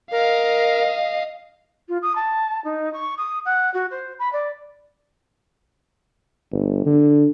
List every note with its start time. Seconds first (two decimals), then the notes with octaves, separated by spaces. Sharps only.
0.12 A#4 D#5 F5
1.88 F4
2.02 D#6
2.15 A5
2.64 D#4
2.93 C#6
3.17 D#6
3.45 F#5
3.73 F#4
3.90 C5
4.19 B5
4.32 D5
6.52 G1
6.85 D3